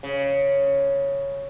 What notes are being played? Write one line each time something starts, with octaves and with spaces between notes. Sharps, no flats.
C#3